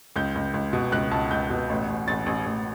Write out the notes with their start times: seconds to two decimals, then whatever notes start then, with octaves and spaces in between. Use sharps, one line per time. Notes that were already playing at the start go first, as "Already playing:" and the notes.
0.16 C#2 G6
0.35 C#2
0.54 C#2
0.73 B2
0.92 C#2 F#6
1.11 C#2 A5
1.31 C#2 G6
1.50 B2
1.70 A1
1.88 A1
2.08 A1 A6
2.26 A1
2.46 A1